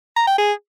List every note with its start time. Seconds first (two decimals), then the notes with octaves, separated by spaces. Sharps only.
0.17 A#5
0.27 G5
0.38 G#4